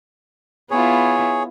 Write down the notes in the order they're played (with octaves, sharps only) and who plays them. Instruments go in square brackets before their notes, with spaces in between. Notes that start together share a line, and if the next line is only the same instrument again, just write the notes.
[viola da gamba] B3 E4 F4 [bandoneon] G#4 C#5